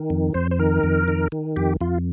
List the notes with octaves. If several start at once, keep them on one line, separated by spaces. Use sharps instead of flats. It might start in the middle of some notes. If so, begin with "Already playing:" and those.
Already playing: D#3
F2
F2 C5
C5
D#3 A#4
F2
D#3
D#3
F2 G4
F2 F4